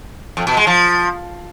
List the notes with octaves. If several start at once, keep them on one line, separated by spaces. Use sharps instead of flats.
F2
B2
G#3
F3